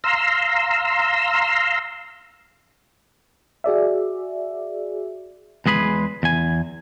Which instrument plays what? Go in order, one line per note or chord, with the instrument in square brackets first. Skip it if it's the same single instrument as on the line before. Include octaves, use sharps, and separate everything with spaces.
[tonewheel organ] F5 A#5 C6 E6
[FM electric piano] F#4 G#4 D5 E5
[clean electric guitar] E2 G#3 G#4 B4 B5
E2 G#5